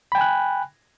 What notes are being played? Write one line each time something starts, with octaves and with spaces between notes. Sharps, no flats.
G5 G#5 B5 F#6